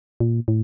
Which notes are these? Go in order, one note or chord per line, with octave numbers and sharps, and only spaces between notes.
A#2
A2